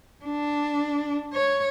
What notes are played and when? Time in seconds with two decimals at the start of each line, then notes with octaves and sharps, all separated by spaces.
0.25 D4
1.33 C#5